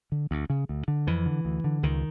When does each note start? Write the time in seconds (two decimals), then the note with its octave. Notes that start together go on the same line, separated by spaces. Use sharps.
0.12 D3
0.31 D2
0.50 C#3
0.69 D2
0.88 D3
1.07 F2 E3
1.26 D3
1.45 D2
1.64 D3
1.83 C#2 D#3